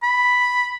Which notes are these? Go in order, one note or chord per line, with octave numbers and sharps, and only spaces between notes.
B5